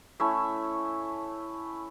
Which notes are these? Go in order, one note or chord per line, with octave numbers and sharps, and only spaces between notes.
A3 C#4 E4 E5